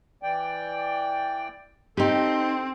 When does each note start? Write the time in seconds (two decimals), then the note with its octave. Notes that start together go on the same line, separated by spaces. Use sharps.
0.23 E3 D5 G5
1.97 C4 D#4 G4 A4